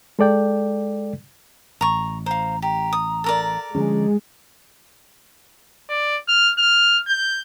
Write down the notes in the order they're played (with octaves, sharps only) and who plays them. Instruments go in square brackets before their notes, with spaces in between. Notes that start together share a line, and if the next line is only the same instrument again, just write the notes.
[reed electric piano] G#3 A4 D5 G5
[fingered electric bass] A1 [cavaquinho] A#5 C#6
[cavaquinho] C5 F5 [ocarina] A#5
[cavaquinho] G4 [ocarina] A#5
[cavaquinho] D#6
A4 A#4 D5
[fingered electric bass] D3 F3 C#4 [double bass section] G#3
[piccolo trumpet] D5
F6
F6
G6